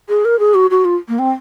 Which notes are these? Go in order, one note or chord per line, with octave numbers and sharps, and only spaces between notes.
G#4
A#4
G#4
F#4
F#4
F4
A#3
C4